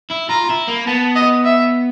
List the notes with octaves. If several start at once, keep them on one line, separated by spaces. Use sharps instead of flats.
E4
F4 A#5
E4
A#3
B3 A5
D#5
E5